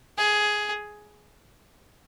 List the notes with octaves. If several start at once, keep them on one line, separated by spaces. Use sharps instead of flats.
G#4